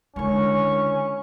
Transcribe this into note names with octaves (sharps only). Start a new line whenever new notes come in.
D#2 D3 G#3 C#4 E4 C#6